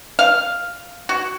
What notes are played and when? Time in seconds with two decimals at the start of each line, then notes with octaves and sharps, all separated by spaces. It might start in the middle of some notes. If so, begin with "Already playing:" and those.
0.19 F5
1.09 F#4